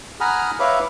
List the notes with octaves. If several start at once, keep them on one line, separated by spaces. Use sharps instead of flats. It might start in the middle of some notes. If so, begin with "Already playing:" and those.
F#5 G#5 A#5 B5 D#6 F6
B4 C#5 E5 F5 B5 D6